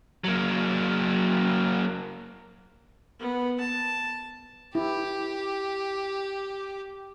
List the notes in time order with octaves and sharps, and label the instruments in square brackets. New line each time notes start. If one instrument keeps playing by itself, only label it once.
[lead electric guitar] F#3 A#3
[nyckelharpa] B3
A5
[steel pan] E4 [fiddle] G4